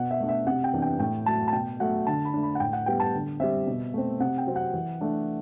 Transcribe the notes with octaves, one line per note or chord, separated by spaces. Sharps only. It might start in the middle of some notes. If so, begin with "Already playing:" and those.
Already playing: B2 F#5
E5
A3 D4
E5
C3 F#5
G5
E3 B3 D4
G5
A2 G5
F#3 A3 A5
A5
B2 G5
F#3 A3 F#5
D3 A5
B5
A3 D4
B5
F#5
A2 G5
F#5
G3 B3 G5
A5
D3
G3 C4 E5
B2
A3 C4
C3 F#5
G5
F#3 C4
F#5
E3
A3 D4